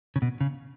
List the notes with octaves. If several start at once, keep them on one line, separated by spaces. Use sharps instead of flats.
C#3
B2
C#3